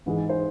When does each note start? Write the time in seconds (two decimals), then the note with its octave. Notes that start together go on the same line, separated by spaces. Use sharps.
0.06 G#2 E3 G#3
0.29 C5